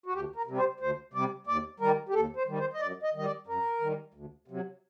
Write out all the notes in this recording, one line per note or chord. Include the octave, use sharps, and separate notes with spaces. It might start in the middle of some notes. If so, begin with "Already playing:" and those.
F#4
D2 G4
A#4
C3 G3
C5
D2 C5
C3 G3 D5
D#2 D5
D#3 G3 A#4
G4
D#2 A4
C5
D#3 G3
C5
D#5
F#2 D5
D#5
D#3 G3 D#5
D5
F#2 A#4
D#3 G3
D2
C3 F#3